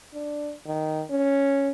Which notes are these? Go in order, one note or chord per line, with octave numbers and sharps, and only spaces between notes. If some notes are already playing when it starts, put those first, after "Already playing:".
D4
D#3
C#4